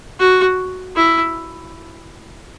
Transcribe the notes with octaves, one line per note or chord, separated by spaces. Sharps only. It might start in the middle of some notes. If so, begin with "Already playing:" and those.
F#4
E4